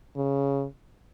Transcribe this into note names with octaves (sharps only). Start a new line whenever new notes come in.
C#3